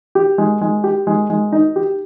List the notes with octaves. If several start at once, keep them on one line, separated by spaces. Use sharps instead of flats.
G4
G#3
G#3
G4
G#3
G#3
D#4
G4